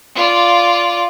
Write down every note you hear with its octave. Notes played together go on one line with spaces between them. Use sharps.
F4 D5